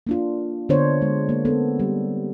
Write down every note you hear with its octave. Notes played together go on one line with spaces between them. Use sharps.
A#3 D4 F4
D3 B3 D4 C5 C#5
G#3
A#3
B3 C4 A4
G3